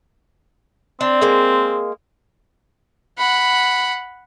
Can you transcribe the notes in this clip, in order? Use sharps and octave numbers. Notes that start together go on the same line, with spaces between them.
C4 D4
G#3 A#3
F#5 B5